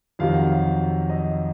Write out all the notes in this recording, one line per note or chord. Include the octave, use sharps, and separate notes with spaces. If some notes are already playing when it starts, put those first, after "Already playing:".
F2 C3 D#3 F#3 F5
F#5
F5
D#5